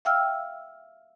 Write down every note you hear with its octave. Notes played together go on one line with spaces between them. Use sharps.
E5 F5 G5 E6 F6